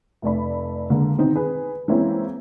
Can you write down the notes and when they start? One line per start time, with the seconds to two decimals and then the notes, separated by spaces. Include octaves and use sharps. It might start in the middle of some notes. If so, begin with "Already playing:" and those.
0.22 F1 A3 D5 B5
0.90 D3 G#3 A#3
1.17 B2 D#3 C4 D#4
1.36 G#4 B4
1.88 E3 G#3 A#3 C4 C#4 E4